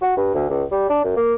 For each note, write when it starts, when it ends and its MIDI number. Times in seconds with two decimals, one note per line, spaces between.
0.01 0.13 66
0.17 0.31 43
0.34 0.44 38
0.50 0.64 37
0.71 0.87 55
0.90 1.01 62
1.04 1.14 42
1.17 1.35 58